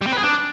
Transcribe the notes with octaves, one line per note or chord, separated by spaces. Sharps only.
G3
C4
B4
G#4
D4